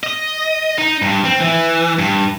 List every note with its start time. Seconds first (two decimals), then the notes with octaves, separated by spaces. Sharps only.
0.03 D#5
0.78 D#4
1.02 G2
1.25 C4
1.40 E3
1.99 G2